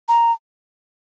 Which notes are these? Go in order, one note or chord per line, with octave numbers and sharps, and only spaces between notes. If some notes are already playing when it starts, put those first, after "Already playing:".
A#5